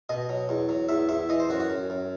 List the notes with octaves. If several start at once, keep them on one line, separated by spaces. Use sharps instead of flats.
B2 D#5
F#3
E2
F#3
E2 E5
E2 E5
E3 D#5
C5
F#2 F#4
F#4
F#2
F#2